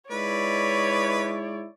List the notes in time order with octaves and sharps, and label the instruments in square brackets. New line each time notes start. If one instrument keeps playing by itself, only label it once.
[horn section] G#3 D#4 E4 [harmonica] B4 [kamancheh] C#5 D5